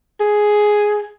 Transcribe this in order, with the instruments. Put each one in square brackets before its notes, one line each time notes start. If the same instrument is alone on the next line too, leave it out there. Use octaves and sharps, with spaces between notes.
[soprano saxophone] G#4